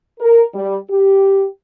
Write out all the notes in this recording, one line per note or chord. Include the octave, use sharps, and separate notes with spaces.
A#4
G3
G4